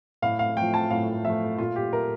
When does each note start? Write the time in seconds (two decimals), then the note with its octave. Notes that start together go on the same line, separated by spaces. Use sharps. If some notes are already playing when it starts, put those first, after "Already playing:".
0.22 A2 F5
0.39 F5
0.57 F3 A3 G5
0.74 A5
0.90 A2 F5
1.25 F3 A3 E5
1.58 A#2 F4
1.76 G4
1.93 A3 A#4